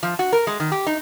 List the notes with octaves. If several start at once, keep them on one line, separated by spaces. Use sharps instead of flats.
F3
F#4
A#4
G#3
D#3
G4
D#4